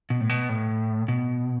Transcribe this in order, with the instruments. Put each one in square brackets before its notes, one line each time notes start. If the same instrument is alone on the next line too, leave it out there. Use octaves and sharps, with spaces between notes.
[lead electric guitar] B2
A2
B2
A2
B2